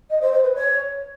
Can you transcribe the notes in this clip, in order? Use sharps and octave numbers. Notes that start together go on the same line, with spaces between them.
D#5
C5
C5
B4
C#5